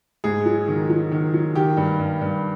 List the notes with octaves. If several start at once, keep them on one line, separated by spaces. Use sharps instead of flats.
G#2 G#4
F#3
D#3
F#3
D#3
F#3
D#3 G4
G2
G2
G2